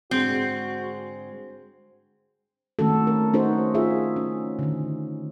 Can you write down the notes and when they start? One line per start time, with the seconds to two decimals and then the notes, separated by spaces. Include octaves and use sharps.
0.11 G#2 D3 G#3 C4 F#4
2.79 D#3 A3 C4 C#4 F#4 A4
3.07 A#4
3.33 C#4 D#4 F#4 A4 C5
3.74 F4 G#4 E5
4.16 C#4
4.59 D3 D#3